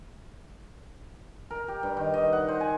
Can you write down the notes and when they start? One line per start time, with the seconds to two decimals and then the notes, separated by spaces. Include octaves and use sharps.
1.50 A#4
1.68 G4
1.83 G2
1.97 D#3
2.14 D#5
2.33 F#5
2.48 C5
2.61 G#5